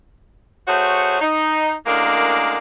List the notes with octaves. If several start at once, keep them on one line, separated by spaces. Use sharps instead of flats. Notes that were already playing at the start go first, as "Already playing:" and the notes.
A3 F#4 G#4 C5 C#5
D#4
F#2 A2 G#3 A#3 D4 A#4